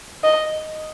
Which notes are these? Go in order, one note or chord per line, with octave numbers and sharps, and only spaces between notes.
D#5